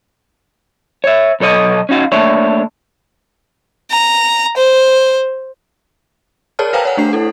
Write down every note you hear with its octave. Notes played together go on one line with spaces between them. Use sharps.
C#5 E5
B1 A4 C#5 D#5
C#4 D#4 F#4 F5
A3 A#3 D4 C#5 E5
A#5
C5
G#4 A#4 C#5 D5 A5 F6
B4 C5 F5 G5 G#5 A#5
C#5 F#5 G#5
A3 D4 C7
E4 A4